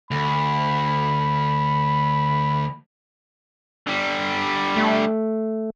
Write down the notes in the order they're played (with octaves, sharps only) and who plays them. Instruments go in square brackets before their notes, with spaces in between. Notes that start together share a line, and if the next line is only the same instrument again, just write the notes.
[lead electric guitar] D2 [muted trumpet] B5
[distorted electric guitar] D3 G3
[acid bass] A3